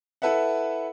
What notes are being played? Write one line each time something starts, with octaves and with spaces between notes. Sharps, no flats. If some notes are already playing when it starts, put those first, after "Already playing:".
E4 A4 B4 E5 F#5